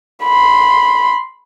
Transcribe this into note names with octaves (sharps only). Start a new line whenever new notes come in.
B5 C6